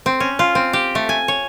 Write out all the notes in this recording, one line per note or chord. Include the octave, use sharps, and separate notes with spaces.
C4
C#4
F4
C4
G4
A3
G#5
C#5